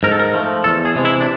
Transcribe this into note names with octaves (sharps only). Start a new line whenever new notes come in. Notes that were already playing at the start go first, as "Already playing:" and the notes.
G#2 A#4
A4
A#4
F3 A3
E2 A4
G#4
C3 E3 G#3
E4
D4